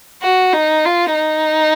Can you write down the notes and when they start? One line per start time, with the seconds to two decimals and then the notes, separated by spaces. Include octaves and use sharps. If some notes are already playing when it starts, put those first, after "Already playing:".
0.22 F#4
0.53 D#4
0.85 F4
1.15 D#4